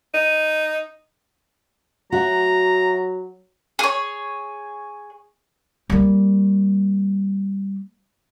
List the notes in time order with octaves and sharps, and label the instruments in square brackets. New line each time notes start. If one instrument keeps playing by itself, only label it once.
[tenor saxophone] D#4
[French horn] F#3 [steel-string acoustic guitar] F#4 E5 [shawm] A#5
[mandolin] G#4 C#5
[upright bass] G3 A#3